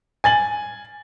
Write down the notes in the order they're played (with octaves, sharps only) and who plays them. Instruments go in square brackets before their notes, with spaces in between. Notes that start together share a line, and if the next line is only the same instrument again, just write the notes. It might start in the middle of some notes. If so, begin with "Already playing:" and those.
[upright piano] G#5 A6 F#7